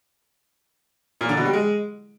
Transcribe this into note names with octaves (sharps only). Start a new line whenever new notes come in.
A#2
D3
B2
G3
G#3